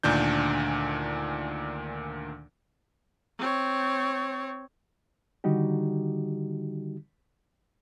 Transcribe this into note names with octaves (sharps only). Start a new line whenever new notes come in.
D2 A#2 D#3 D4 G6
C4 C#5
D3 D#3 G3 D#4 F#4 G4